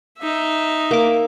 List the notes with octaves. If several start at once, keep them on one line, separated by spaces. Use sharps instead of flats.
D#4 E5
A#3 D6